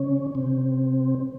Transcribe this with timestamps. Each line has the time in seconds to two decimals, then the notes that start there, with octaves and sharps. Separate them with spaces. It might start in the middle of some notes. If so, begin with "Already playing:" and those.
Already playing: C#3 C#4
0.35 C3 C4